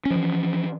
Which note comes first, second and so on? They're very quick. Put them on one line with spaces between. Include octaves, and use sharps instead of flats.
C#4 F3 E3